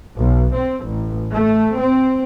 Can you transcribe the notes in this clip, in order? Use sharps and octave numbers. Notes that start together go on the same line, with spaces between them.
B1
C4
A1
A3
C4